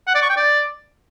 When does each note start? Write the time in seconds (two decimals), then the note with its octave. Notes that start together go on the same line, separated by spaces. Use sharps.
0.07 F#5
0.15 D5
0.22 C#6
0.29 G5
0.37 D5